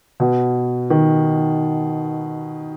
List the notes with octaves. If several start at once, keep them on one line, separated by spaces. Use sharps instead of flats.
B2
D#3